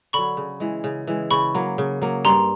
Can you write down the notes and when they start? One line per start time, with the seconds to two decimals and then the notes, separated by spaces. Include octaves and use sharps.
0.13 D3 F#3 B5 C#6
0.37 C#3
0.60 E3 G#3
0.84 C#3
1.07 E3 G#3
1.31 C#3 B5 C#6
1.55 F#3 A#3
1.78 C#3
2.02 F#3 A#3
2.25 G2 A#5 C6